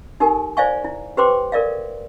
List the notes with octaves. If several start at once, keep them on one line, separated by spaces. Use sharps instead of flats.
D#4 G4 A4 A#4 G#5
C5 D5 E5 F5 G#5 C#6
E4
G4 B4 C5 G5 C6 D6
A4 A#4 D5 E5 F5